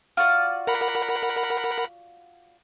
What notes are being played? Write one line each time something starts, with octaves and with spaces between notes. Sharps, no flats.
F4 F#4 D5
A#4 F#5 B5